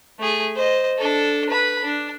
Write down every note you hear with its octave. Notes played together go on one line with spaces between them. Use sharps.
A3 G#4
C5 D#5
D4 A4
B4 B5
D4